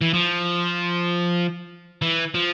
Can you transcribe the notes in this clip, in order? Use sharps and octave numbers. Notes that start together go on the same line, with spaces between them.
E3
F3
E3
F3